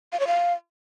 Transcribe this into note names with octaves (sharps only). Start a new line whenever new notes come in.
F5
C#5
F5